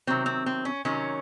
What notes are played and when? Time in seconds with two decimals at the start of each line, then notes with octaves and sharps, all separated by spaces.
0.07 C3 D#3 F#3 C4
0.26 C4
0.46 C4
0.65 C#4
0.85 C3 D#3 F#3 C#4